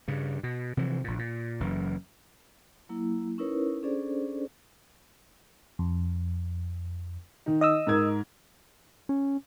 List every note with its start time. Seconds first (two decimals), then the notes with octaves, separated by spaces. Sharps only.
0.08 G2 C#3
0.43 B2
0.77 C3 E3 F3
1.04 A#1 A#2
1.19 A#2
1.60 F#1 F#2 E3
2.89 F#3 A#3 E4
3.38 C#4 D#4 E4 A#4 B4 C#5
3.83 C#4 D4 G#4 A4 C5 D5
5.79 F2
7.46 D#3 D#4
7.61 D#5 D#6 E6
7.87 G#2 A#4 G#6
9.09 C#4